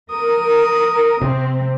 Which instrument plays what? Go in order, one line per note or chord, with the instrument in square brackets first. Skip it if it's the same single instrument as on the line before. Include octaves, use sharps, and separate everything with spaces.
[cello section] A#4 [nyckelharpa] D#6
[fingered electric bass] C3 [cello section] C4